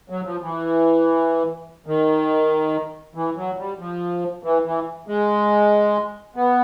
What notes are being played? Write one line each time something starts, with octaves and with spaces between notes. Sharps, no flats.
F#3
F3
E3
D#3
E3
F#3
G3
F3
E3
E3
G#3
B3